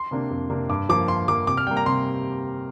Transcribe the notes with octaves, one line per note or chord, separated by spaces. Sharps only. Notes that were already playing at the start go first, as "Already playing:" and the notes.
Already playing: C6
C3 A#3 D4
F2
C3 A#3 D4
G2 D6
F3 A#3 D6
G2 C6
F3 A#3 D6
C3 D6
F6
G3 A#3 G5
A#5
C3 C6